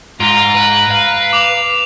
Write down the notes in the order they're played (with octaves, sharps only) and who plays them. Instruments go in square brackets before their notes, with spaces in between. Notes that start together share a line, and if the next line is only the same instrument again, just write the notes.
[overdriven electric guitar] G#2 [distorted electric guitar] F4 [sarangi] A#5 [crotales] D7
[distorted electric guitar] B4
[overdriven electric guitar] F5
[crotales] D6 F7